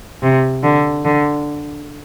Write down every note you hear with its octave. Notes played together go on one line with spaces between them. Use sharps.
C3
D3
D3